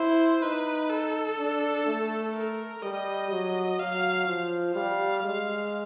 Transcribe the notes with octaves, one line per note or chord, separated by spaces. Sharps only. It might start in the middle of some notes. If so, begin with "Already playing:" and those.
Already playing: E4 C5
D#4 B4
A4
D4
A3
A#4
G3 D#5
F#3
F#3 F5
F3
G3 F5
G#3